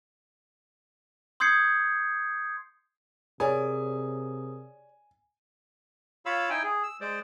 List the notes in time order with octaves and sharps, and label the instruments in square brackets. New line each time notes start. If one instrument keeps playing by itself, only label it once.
[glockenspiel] C6 D#6 G6 G#6 C7 C#7
[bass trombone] C3 [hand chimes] G#4 A#4 D#6 [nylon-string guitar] C#5 D5 [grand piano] G#5
[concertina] F4 C#5 F5 B5 E6
D#4 E4 G5 G#5
G#4
E6
G#3 C5 D5